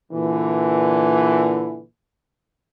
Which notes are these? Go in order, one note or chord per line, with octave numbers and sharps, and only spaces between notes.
A#2 D3 E3